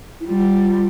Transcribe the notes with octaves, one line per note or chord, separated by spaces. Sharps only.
E4
G3 F4